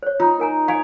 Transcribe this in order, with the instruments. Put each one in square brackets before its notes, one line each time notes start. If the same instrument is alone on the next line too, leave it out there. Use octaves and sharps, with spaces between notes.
[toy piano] C5 C#5
[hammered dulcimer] D#4 [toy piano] F4
[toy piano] A#4 G#5 A#5
[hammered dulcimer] C#5 [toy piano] F5 G#5